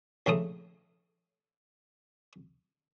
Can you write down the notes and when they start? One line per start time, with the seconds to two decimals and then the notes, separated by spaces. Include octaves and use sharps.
0.26 A#1 C#3 A3 D#6